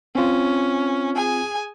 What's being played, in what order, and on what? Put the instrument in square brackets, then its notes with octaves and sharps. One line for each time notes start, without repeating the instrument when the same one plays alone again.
[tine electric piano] C4 F4 [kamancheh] C#4
[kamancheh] G#4 G#5